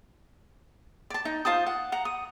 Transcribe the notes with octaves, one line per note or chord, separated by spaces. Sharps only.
D5 A5
D#4
F4 C5 A5 D#6
F#5
F#5 A#5
D#6